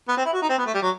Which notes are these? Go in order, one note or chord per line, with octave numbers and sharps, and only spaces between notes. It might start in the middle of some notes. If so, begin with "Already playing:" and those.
B3
C4
E4
F#4
D#4
C4
B3
A3
G3
F#3